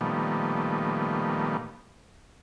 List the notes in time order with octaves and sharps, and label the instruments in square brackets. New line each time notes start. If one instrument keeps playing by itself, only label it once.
[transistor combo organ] A#2 D#3 F3 G3 A3 B3